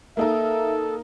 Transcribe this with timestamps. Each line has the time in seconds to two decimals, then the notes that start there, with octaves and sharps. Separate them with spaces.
0.17 A#3 D#4 A4 A#4 E5